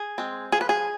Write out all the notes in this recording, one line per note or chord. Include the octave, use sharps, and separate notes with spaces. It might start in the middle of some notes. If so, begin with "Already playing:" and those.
Already playing: G#4
G#3 C4
F3 G#4
B4
G#4